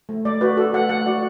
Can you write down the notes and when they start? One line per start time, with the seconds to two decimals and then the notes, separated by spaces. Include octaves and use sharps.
0.09 A3
0.25 A3 D5
0.41 F#4 B4
0.57 F#4 A4
0.73 A3 F#5
0.89 A3 F#5
1.06 F#4 D5